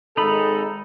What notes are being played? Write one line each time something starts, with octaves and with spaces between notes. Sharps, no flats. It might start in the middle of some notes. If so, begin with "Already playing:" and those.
G#1 G#3 D#4 A4 B5